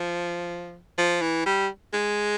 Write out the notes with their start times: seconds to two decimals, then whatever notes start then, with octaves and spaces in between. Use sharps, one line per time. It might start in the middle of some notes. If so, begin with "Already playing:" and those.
Already playing: F3
0.98 F3
1.22 E3
1.46 G3
1.93 G#3